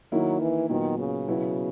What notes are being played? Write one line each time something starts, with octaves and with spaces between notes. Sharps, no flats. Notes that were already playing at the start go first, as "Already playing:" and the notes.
D#3 F#3 A#3 E4
E3
A#2 D#3 F#3 B3
C#3
B2 F#3 B3 E4